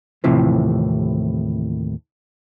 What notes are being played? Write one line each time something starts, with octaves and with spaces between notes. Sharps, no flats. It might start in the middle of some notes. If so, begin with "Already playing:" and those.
D#2 A2 C3 E3 F3